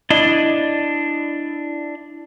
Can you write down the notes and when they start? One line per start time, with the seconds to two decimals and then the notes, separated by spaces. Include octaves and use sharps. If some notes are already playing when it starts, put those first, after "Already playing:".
0.10 D4 E4 D5 D#5